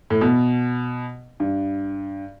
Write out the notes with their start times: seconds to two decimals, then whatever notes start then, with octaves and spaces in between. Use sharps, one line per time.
0.10 A2
0.21 B2
1.40 G2